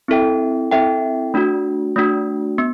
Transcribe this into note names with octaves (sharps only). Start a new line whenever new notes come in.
C4 E4 A4 E5 G5
C4 E4 A4 E5 G5
A3 D4 F#4
A3 D4 F#4
B3